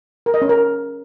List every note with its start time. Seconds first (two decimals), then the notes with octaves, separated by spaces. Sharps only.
0.26 A#4
0.34 D#5
0.42 C#4
0.49 A#4